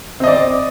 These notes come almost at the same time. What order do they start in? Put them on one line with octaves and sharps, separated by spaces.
C4 D#5 D5